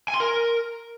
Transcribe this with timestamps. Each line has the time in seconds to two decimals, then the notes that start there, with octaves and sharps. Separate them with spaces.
0.08 G#5
0.14 C6
0.20 A#4